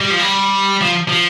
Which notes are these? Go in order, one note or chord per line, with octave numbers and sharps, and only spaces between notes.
G3
F3
G3
F3
F3